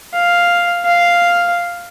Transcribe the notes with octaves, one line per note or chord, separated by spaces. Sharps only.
F5
F5